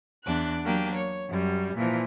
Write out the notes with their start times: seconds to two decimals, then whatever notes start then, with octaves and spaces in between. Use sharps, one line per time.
0.23 E2 D4 F#6
0.63 F#3 A#3 D4 G4
0.95 C#5
1.29 F#2 G3
1.76 A#2 E3 F3